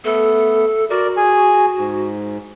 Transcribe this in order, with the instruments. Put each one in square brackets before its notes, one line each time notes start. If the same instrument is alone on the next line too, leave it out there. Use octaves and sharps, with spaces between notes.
[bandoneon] A3 B3 [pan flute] A4
[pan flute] F#4 [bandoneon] A#4 D5
[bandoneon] G#4 G#5
G#2